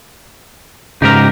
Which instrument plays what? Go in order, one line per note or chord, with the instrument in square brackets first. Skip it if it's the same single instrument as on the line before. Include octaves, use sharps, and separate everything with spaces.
[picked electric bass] G#2 C#3 [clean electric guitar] D#4 G4 A#4